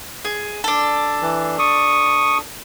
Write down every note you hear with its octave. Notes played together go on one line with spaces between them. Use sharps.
G#4
D4 A4
E3
C#6 D#6